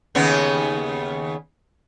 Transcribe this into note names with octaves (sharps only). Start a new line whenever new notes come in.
D#2 C#3 B3